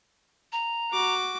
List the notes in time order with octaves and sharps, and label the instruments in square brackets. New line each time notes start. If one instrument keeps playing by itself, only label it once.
[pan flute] A#5
[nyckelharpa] F#4 D6